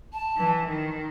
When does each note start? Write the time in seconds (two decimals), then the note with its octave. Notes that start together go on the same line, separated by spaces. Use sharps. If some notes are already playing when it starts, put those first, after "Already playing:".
0.13 A5
0.37 E3
0.67 D#3